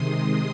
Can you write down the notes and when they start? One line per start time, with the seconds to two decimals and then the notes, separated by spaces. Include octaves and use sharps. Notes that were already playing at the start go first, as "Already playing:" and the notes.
Already playing: C3 D#3 G#3 C6 D#6